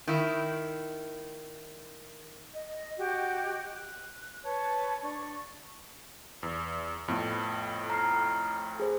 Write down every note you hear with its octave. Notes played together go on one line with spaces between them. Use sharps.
D#3 E4
D#5
F#4 G4 D#5 G5
F#6
B4 C#5 A5
D4 D5 C#6
E2
F2 A2 B3
A#5 F6 C7
G#4 C5